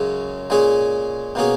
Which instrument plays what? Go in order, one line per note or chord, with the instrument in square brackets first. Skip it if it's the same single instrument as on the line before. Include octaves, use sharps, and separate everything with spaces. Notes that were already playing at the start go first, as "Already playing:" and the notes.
Already playing: [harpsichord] F#2 C#3 G#3 C#4
A#2 G#3 C#4 G#4
B2 A#3 C#4 G#4